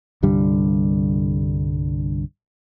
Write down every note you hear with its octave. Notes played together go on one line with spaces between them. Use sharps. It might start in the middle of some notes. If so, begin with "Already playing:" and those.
C2 G2 D3 G3